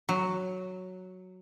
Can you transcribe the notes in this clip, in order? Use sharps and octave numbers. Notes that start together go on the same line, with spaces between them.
F#3